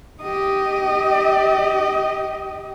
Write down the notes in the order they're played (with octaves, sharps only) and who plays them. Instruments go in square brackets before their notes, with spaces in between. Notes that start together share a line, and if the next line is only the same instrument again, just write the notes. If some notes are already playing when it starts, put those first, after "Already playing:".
[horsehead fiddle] G4 D#5